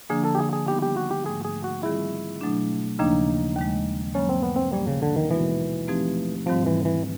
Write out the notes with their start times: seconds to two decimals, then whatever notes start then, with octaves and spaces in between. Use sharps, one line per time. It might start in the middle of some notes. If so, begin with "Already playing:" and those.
0.09 D3 F3 A#3 D4 G#4
0.25 A4
0.35 G4
0.39 G#4
0.53 G#4
0.68 D#3 G3 B3 D#4 G4
0.82 G4
0.97 F#4
1.11 G4
1.25 G#2 F3 A3 G#4
1.45 G#4
1.64 F#4
1.83 D#3 G3 C4 E4 F4 G#4
2.41 B2 F#3 A3 D4
2.99 D#2 C#3 F3 A#3 D4 D#4
3.56 D#2 D#3 G#3
4.14 G2 D#3 F#3 A#3 C#4
4.29 C4
4.43 B3
4.56 C4
4.73 A#2 F3 G3 A#3 C#4
4.87 C#3
5.02 D3
5.16 D#3
5.31 B2 E3 G#3 B3 D#4 F#4
5.88 F3 A3 C4 D#4 G4
6.46 G#2 D#3 F3 G3 C4
6.66 E3
6.85 E3